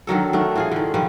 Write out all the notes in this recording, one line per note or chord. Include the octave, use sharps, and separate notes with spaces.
D3 D#3 F#3 A4
D#3 A3 D4
E3 F4 G#4
D3 D#3
D#3 F3 G3 B4